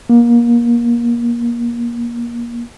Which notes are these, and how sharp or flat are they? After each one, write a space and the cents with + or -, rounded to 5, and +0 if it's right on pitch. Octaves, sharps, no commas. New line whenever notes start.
A#3 +25